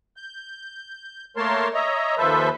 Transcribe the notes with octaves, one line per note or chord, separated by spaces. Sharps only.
G6
A3 A#3 A#4 C#5 A5 C6
C#5 D#5 E5 A#5
D#2 F3 A4 B4 C5 E5